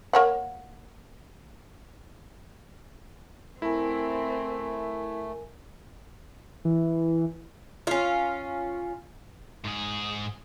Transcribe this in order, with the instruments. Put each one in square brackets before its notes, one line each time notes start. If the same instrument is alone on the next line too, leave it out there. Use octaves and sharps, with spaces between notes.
[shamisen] A#3 C#5 F#5
[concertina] A3 [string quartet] C4 [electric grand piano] E4 [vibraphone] A#4 G#5
[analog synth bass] E3
[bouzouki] C#4 F4
[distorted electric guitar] G#2 G#4